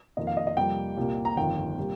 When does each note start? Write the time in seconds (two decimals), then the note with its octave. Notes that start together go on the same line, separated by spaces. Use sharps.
0.17 F2 D#3 A#3 D#5
0.27 F5
0.37 D#5
0.47 D#5
0.57 F2 C3 G3 A#3 G5
0.97 C2 A#2 G3 A#3
1.25 A#5
1.37 G1 F2 D#3 A#3 G5
1.77 C3 G3 A#3